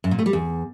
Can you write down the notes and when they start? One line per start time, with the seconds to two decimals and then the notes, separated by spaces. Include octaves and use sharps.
0.04 F#2
0.11 A#2
0.19 A3
0.26 G3
0.33 E2